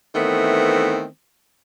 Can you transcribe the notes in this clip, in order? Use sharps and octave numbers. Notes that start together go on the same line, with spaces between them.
D#3 E3 A3 B3 C4